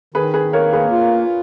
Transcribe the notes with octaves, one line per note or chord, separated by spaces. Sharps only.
D#3 G#4 B4
G#4 B4
A#3 A#4 C#5
G#4 B4
F4